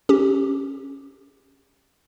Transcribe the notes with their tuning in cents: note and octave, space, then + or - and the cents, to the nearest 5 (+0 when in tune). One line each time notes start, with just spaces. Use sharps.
C#4 +0 G4 +0